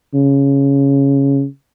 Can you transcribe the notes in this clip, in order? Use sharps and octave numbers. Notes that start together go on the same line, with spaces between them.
C#3